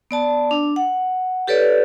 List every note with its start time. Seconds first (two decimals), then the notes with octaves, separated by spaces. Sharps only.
0.11 B3 D5 A5
0.51 D4
0.76 F#5
1.47 G4 A4 B4 C#5 D5